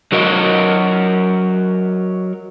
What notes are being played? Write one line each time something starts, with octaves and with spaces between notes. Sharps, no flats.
F#3 F#4 A#4 D#5